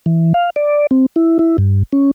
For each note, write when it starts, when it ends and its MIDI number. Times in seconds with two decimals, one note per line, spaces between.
0.06 0.33 52
0.34 0.50 77
0.56 0.87 74
0.91 1.06 60
1.16 1.38 64
1.39 1.57 64
1.58 1.83 43
1.93 2.11 61